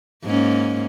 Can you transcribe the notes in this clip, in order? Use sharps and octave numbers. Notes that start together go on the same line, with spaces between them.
G#2 A#3 C#4